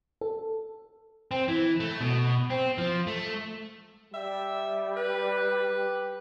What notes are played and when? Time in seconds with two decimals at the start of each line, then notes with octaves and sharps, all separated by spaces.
0.21 A4
1.31 C4
1.48 E3
1.80 A3
2.01 B2
2.50 C4
2.78 F3
3.07 A3
4.14 G3 E5
4.97 B4
5.75 G4